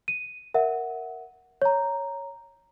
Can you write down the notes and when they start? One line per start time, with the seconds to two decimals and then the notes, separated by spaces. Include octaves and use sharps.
0.08 D#7
0.54 A#4 E5 F#5
1.62 C#5 A#5